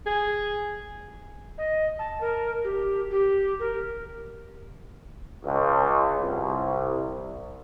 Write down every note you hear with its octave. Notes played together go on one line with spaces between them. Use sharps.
G#4
D#5
A5
A#4
G4
G4
A#4
C#2
C2